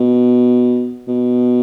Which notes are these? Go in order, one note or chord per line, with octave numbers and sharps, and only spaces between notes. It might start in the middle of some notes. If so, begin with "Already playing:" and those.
Already playing: B2
B2